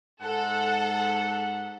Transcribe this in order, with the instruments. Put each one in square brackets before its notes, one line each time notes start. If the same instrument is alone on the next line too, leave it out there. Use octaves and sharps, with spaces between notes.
[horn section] G#2 F#5 [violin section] A4